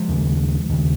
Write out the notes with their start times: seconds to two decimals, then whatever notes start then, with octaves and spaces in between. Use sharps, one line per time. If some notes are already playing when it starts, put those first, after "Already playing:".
Already playing: F3 G#3
0.09 D#2 C#3
0.69 D#2 C#3